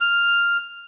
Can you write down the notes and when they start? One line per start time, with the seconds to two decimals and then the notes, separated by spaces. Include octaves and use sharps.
0.01 F6